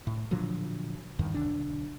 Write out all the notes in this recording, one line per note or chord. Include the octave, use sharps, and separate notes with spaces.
A2
A#2 D3 F3 F#3
E2 G2 D#3
B1 D3 D4